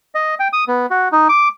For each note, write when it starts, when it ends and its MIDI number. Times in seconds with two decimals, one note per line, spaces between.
0.15 0.35 75
0.40 0.48 79
0.53 0.64 87
0.68 0.86 59
0.91 1.08 66
1.12 1.28 63
1.29 1.48 86